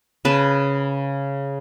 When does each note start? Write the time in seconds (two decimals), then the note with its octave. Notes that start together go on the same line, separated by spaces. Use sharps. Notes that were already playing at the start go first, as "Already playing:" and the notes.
0.25 C#3 B4 A5